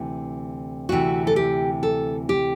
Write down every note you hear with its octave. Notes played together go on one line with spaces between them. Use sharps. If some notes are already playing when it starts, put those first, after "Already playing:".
Already playing: D2 C3 E3
D2 C3 E3 F#4
A4
G4
A4
G4